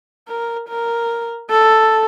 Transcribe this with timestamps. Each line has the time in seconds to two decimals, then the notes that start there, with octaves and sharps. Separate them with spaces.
0.29 A#4
0.69 A#4
1.50 A4